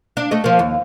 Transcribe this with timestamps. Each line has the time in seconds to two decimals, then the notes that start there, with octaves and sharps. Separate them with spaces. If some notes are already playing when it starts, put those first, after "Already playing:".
0.17 D4
0.31 A3 D#5
0.44 F3 A#3
0.59 D#2